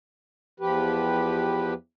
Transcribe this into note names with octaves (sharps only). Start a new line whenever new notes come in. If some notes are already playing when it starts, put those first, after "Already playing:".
E2 F3 G4 B4